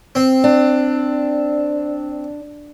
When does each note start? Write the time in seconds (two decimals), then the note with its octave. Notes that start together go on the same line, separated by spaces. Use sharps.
0.15 C4
0.44 D4